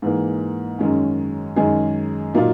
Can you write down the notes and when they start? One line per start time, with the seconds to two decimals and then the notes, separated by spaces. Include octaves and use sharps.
0.02 G#2 E3 A#3
0.79 F#2 D#3 G#3 C#4
1.56 F#2 D#3 G#3 D#4 G#4
2.34 A#2 F#3 A#3 D#4